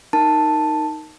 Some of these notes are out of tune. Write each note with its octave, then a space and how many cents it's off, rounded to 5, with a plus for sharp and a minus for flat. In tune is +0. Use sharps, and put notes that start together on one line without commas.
D#4 +0 A#4 +0 A5 +0